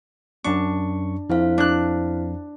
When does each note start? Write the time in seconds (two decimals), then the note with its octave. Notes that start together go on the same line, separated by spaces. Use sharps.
0.45 F#2 D4 C#6
1.30 F2 E4 C5 F5
1.58 D4 F#6